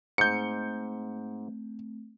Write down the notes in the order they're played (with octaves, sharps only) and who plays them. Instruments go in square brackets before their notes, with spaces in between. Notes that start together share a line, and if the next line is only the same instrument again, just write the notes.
[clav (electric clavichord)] G#2 [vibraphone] A3 C4 [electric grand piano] G6 C#7